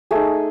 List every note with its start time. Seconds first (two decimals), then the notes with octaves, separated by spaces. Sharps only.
0.11 A3 D#4 G#4